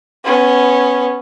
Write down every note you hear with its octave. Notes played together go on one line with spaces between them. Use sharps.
B3 C#4